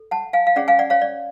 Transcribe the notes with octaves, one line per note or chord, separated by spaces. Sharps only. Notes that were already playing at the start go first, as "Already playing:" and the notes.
Already playing: A4
F#5 A5
F5 G#5
F5
C#4 G#4 C#5 D5 F#5
F5 G#5
D5 F#5
C#5 F5
D5